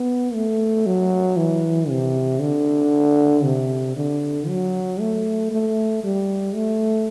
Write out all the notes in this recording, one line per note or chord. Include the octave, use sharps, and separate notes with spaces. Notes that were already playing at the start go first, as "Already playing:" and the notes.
Already playing: B3
A3
F#3
E3
C3
D3
C3
D3
F#3
A3
A3
G3
A3